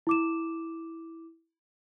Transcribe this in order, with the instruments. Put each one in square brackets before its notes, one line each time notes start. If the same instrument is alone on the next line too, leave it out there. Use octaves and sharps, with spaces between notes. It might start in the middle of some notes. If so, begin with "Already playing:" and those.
[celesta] E4 D6 E7